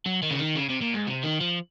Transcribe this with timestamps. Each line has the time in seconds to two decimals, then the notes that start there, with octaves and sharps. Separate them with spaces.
0.06 F#3
0.23 D#3
0.31 C#3
0.39 D#3
0.56 C#3
0.69 C3
0.81 A#2
0.94 G#2
1.07 C3
1.23 D#3
1.40 F3